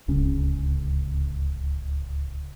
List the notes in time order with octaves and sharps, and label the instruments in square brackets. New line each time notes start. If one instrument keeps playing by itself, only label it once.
[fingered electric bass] D1 C#2 C#3 C#4